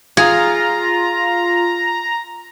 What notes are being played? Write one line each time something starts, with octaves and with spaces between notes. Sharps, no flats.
F4 G#4 A#5